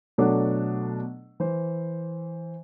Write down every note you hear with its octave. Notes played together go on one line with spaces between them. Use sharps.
B2 F#3 A3 D4 A4 F#5
E3 C5